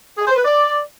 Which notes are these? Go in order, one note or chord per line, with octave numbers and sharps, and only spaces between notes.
G#4
C5
B4
D5